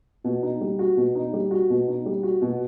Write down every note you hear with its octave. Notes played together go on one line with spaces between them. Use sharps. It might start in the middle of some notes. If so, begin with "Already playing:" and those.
B2
D#4
G3
F#4
B2
D#4
G3
F#4
B2
D#4
G3
F#4
B2